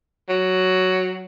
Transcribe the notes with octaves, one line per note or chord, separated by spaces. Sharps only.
F#3